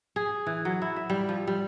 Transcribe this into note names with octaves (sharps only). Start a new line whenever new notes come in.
G#4
E3
F#3
E4
E5
G3
F3
G3